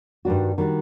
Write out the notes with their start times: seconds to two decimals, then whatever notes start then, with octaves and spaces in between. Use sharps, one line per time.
0.25 G2 D#3 G3 D4 F#4
0.58 D#3 G3 D4 F#4